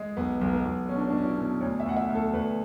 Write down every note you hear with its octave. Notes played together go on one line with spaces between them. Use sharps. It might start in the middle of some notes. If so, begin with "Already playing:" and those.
Already playing: G#3
B1 B3
B1
B3
B1
B2 C#4
D4
C#4
D4
B2 C#4
E4
B2
D2 C#5
E5
D2 F#5
E5
D2
A4
D2 B4